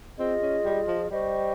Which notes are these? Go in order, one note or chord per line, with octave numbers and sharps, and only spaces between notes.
C4 F4 G#4 D#5
C#4
G3
F3
G3 C5 D#5 G5 C#6